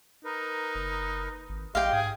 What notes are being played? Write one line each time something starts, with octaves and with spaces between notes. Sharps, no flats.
D#4 A#4 B4
F#1
G#1
A#1 G4 D#5 F5 G5 C6
G#2 G#4 D#6